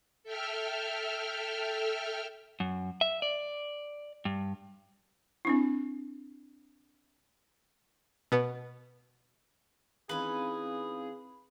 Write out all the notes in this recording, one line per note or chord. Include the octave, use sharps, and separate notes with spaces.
A4 E5 G5 F6
F#2
E5
D5
G2
C4 D4 E4
B2 B3
E3 C4 C#4 D#4 G#4 B4 F5